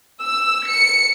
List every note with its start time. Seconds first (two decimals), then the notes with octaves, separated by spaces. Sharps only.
0.24 E6
0.67 C#7